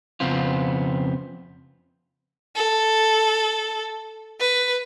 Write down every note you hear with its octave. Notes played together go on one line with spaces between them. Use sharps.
F2 C#3 B3 C4 F4
A4
B4